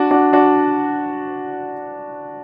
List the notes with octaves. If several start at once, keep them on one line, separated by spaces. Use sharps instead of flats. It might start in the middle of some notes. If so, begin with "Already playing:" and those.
Already playing: D4 F#4
D4 F#4
D4 F#4